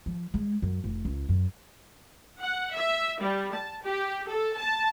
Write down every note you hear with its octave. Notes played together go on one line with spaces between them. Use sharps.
F3
G#3
F#2
F1
C#2
F#2
F#5
E5
G3
A5
G4
A4
A5